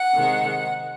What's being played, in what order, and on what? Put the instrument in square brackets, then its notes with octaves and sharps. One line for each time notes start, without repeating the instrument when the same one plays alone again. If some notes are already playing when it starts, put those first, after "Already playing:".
Already playing: [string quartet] F#5
C3 D#3 G#3